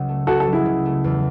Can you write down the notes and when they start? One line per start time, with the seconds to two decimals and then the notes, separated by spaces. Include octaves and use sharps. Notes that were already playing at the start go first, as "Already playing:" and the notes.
Already playing: C#2 C#3 F#3
0.08 A3
0.27 C#2 F#4 A4
0.40 F#4 A4
0.47 F#3
0.53 E4 G#4
0.66 C#3
0.85 A3
1.04 E2